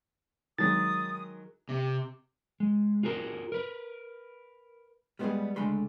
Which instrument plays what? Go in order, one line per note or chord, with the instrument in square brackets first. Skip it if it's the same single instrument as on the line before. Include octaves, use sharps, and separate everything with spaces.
[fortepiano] D#3 F#3 G#3 [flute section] D#6 [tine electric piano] A6
[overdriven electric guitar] C3
[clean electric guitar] G#3
F4 F#4 G#4 A#4
A#4 B4
[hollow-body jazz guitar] G3 G#3 B3 D#4 G4 G#4
C#2 D3 G#3 A3 B5 C6